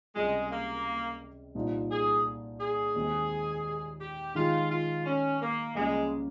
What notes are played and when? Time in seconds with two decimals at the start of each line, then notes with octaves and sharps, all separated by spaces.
0.15 C#2 C3 G3 G#3
0.50 A#3
1.55 C2 A#2 F3 A#3 D#4
1.90 G#4
2.60 G#4
2.96 D#2 D#3 G#3 C4
4.01 G4
4.35 D#3 G#3 D#4 F4 G4
4.70 F4
5.05 C#4
5.41 A#3
5.75 C#2 C#3 G3 G#3 A#3